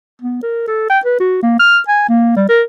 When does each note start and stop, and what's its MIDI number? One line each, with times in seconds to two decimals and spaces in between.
0.22 0.41 59
0.43 0.66 70
0.68 0.88 69
0.90 0.99 79
1.05 1.20 71
1.20 1.39 66
1.42 1.55 58
1.59 1.79 89
1.88 2.04 80
2.09 2.33 58
2.36 2.44 55
2.49 2.63 70